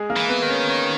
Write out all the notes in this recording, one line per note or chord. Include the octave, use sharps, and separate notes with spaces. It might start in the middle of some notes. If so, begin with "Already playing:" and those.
Already playing: G#3 G#4
A#3 A#4
E3
B3 B4
D#3
C#4 C#5
C#4 C#5